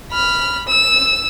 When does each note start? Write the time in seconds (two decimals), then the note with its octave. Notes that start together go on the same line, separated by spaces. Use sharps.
0.12 B5 F6
0.68 E6